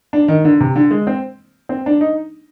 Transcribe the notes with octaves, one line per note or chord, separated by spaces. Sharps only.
D4
D#3
D3
C3
D3
G#3
C4
C4
D4
D#4